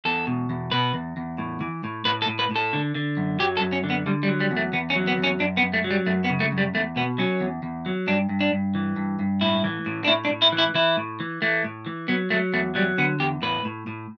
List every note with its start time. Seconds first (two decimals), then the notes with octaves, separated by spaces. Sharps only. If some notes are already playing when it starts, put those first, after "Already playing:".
0.05 E2 A4
0.27 B2
0.50 E2
0.71 B2 B4
0.94 E2
1.17 E2
1.38 A2
1.61 E3
1.84 A2
2.05 A2 B4
2.22 A4
2.28 A2
2.39 B4
2.51 A2 A4
2.73 D3
2.95 D3
3.17 F#2
3.39 F#3 G4
3.57 A4
3.61 F#2
3.73 C#4
3.84 D3
3.90 B3
4.06 D3 G3
4.23 G3
4.28 F#3
4.40 G3
4.51 E2
4.57 A3
4.73 E2 B3
4.90 C#4
4.96 F#3
5.07 B3
5.18 E2
5.24 C#4
5.40 F#2 D4
5.57 B3
5.62 F#2
5.74 A3
5.84 F#3
5.91 G3
6.06 F#2 A3
6.24 B3
6.30 C#3
6.40 A3
6.52 F#2
6.58 G3
6.74 E2 A3
6.96 B2 B3
7.18 F#3 C#4
7.41 E2
7.63 E2
7.86 F#3
8.07 G2 D4
8.29 G2
8.41 D4
8.52 G2
8.75 E3
8.96 G2
9.19 G2
9.41 A2 E4
9.64 E3
9.86 A2
10.04 D4
10.08 A2 E4
10.25 D4
10.30 A2
10.42 E4
10.52 E3
10.58 E4
10.75 E3 E4
10.97 A2
11.20 E3
11.42 E3 A3
11.64 A2
11.86 E3
12.08 F#3 B3
12.30 F#3 A3
12.53 E2 A3
12.75 F#3 G3
12.98 D3 B3
13.20 E2 G4
13.42 A2 B4
13.65 A2
13.87 A2